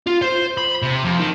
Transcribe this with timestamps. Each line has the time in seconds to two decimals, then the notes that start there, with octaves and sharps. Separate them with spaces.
0.07 F4
0.22 C5
0.58 B5
0.83 C3
1.04 F2
1.20 D#3